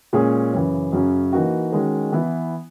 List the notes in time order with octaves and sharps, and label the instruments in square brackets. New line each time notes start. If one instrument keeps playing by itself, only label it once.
[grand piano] A#2 G#3 C#4 G#4
F#2 C#3 E3
F#2 C#3 F#3 C#4
E3 A#3 D#4 F#4
D#3 G#3 C#4 F#4
E3 B3 E4